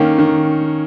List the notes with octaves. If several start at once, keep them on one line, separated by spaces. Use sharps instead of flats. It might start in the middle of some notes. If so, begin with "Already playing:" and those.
Already playing: D#3 A#3 C#4
D#3